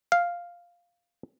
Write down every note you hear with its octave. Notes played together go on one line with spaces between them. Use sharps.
F5